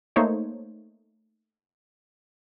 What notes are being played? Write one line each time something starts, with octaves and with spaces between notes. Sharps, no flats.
A3 A#3 D#4 C5 C#5